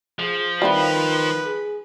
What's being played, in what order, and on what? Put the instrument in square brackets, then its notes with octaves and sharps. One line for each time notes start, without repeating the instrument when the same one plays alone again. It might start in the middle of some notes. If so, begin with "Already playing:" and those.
[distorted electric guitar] F3 [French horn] G#4
[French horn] D#3 [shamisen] G3 C4 E4 [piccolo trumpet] B4
[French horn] G#4